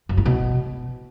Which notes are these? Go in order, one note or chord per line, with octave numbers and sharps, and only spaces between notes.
F#2
A2
B2